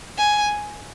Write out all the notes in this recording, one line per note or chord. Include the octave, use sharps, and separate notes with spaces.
G#5